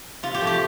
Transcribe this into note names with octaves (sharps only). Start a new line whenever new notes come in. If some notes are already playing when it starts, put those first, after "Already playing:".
C3 F4
G4
F3 A3
G4